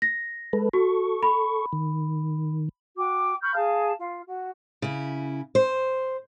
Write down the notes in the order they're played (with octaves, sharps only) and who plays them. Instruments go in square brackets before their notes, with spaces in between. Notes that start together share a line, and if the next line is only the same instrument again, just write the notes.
[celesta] A#6
[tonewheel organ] G#3 A4 B4
[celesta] F#4 [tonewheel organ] A4 C#6
[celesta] B5
[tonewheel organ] D#3
[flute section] F#4 G5 D6
B5 C#6 F6 G6
G#4 F5 A5
F4
F#4
[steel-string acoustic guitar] C#3 E4
C5